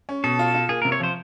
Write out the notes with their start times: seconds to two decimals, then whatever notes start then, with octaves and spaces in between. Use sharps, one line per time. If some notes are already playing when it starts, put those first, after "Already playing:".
0.09 C#4
0.24 B2 A4
0.39 F4
0.54 F4
0.69 A#3 G#4
0.82 C3 A#4
0.92 C#5
1.00 F3 C5